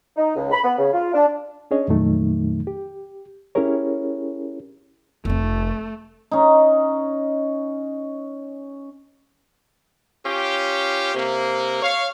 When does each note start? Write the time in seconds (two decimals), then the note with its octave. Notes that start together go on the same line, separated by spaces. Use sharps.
0.16 D#4
0.35 C#2
0.51 B5
0.64 B3
0.78 C#3
0.93 F4
1.13 D4
1.71 C#4 D4 G#4 C#5 D#5
1.88 F2 A#2 D#3 F#3 A3 D#4
2.67 G4
3.55 C#4 E4 G4 G#4 A#4 C#5
5.25 F1 A3 C4
6.31 C#4 D#4
10.26 C#4 F4 G4
11.15 C3 A#3
11.83 C#5 F5